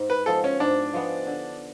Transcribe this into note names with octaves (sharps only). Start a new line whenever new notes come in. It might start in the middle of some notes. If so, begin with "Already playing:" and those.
Already playing: G#2
B4
F3 G#3 B3 A4
C#4
G#2 D4
F3 G#3 B3
D3